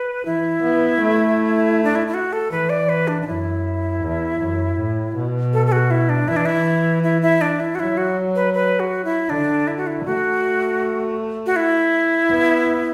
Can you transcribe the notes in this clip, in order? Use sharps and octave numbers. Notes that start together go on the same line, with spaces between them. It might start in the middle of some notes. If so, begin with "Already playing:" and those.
Already playing: B4
E3 E4
B3
A3
D4
E4
E4
F#4
A4
E3 B4
D5
B4
D4
D4
F#2 E4
E2
F#2
A2
B2
A4
A4
F#4
E4
D4
E3 E4
D4
E4
E4
E4
D4
E4
F#4
F#3 E4
F#4
B4
B4
F#4
E4
D3 D4
E4
F#4
E4
A3 F#4
F#4
E4
B3